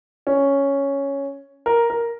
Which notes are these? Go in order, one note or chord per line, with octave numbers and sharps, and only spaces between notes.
C#4
A#4
A#4